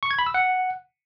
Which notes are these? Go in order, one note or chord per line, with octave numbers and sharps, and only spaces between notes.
C#6
G#6
B5
E6
F#5